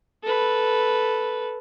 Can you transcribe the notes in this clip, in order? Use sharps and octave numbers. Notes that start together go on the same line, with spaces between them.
A4 B4